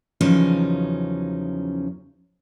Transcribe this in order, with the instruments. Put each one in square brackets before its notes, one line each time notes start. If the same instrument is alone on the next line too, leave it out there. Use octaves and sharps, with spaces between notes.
[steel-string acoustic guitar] E2 C#3 F3 F#3 C#4 D#4